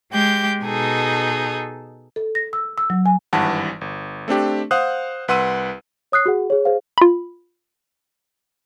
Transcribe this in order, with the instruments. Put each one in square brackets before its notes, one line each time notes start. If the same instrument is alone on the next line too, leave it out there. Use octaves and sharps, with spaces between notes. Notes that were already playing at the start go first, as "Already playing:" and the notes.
[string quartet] G#3 G4 G6
B2 D#4 G#4 A4
[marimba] A4
A#6
E6
E6
F#3
G#5
[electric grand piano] G#1 G2 E3 F#5 A5
G1
A3 C4 D4 G4
C5 F5 F#5 D#6 F#6
C2 B4 F#5 C6 E6 D#7
[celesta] C#5 D#6 F#6 C7
F#4 G#4 F#5
G#4 C#5
G#4 C5 F5
[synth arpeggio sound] F4 B5